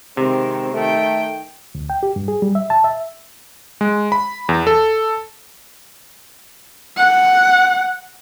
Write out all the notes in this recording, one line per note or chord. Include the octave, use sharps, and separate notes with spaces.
C3 D#3 G#3 C4
D#3 A3 G5
D2
G5
G4
G2
G#4
G3
E5
A5
E5
G#3
B5
E2
A4
F#5